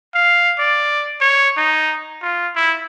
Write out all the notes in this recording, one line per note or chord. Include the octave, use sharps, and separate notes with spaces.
F5
D5
C#5
D#4
F4
E4